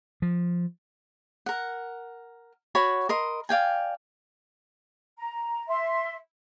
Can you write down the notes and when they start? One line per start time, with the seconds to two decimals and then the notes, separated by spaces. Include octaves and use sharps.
0.22 F3
1.46 A#4 F#5
2.75 F#4 C#5 B5
3.09 A#4 D#5 C6
3.49 D5 F5 G5 G#5
5.19 A#5
5.68 E5 C6